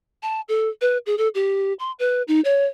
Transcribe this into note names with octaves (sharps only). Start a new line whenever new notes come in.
A5
A4
B4
G#4
A4
G4
C6
B4
D#4
C#5